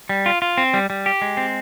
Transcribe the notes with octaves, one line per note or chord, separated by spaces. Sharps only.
G3
F4
F4
C4
G3
G3
G4
G#3
C4